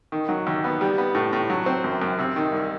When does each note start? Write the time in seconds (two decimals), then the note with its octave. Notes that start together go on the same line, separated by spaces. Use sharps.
0.12 D#3
0.29 F#3
0.47 D#2
0.64 B3
0.81 G3
0.98 B3
1.15 A2
1.33 A2
1.50 F#3
1.66 C4
1.84 F#2
2.02 F#2
2.19 C3
2.36 D#3
2.52 C2